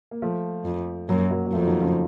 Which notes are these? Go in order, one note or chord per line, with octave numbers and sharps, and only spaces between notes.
A#3
F3 A3
F2
F#2 F#3 A#3
F#3 A#3
F#3
F2 F3 A3
D#3 F#3
C#3 F3